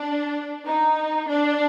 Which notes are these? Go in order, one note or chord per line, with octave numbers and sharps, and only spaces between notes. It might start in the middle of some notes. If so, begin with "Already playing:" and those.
Already playing: D4
D#4
D4